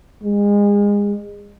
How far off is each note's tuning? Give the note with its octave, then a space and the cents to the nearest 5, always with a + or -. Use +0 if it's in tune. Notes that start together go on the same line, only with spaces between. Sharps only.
G#3 -30